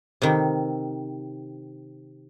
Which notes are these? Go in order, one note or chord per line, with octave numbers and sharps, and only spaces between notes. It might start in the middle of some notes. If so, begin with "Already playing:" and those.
C3 D#3